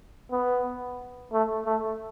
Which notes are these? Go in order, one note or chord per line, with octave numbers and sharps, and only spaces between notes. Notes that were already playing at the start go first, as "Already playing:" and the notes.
B3
A3
A3